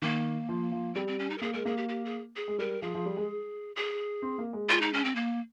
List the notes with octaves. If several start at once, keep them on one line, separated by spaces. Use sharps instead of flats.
D#3 A#3
F3
F3
G3 C4
C4
C#4
D#4
A#4
A#3 G#4
G#3 A#4
A#3 G#4
G4
G4
G#4
G#4
G#3
G3 A#4
F3 G#4
F3
G3
G#3
G#4
C4
A#3
G#3
F4
D#4
C#4
C4
A#3